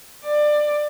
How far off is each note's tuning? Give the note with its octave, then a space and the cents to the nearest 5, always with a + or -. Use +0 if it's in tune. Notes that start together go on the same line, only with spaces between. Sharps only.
D5 +20